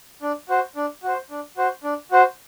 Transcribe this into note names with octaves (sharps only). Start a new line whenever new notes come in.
D4
F#4 C5
D4
F#4 C5
D4
F#4 C5
D4
F#4 C5